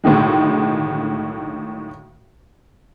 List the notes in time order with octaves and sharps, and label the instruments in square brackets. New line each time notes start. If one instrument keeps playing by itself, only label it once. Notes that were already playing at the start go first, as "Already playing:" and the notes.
[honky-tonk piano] B1 A2 D3 D#3 G#3